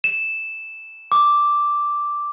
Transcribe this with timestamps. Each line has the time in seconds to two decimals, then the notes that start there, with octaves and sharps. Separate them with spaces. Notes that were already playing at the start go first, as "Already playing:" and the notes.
0.04 E7
1.12 D6